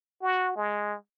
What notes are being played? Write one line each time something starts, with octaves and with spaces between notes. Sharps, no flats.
F#4
G#3